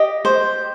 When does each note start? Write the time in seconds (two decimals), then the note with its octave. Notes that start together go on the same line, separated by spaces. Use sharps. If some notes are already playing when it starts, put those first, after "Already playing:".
Already playing: G4 D#5 D#6
0.25 C5